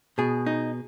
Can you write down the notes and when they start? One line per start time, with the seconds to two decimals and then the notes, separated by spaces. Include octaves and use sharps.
0.18 B2 G#4
0.46 D#4